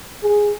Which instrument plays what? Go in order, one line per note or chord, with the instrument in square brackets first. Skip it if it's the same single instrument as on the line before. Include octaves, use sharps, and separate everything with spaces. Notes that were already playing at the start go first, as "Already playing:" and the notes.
[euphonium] G#4